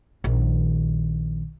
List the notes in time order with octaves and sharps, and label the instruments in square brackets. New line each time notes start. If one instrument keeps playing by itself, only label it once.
[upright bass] A#1 D#3